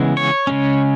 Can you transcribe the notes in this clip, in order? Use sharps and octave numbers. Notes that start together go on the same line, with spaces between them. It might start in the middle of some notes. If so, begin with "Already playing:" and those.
Already playing: C#3 E3 G#3 B3
C#5
C#3 G#3 C#4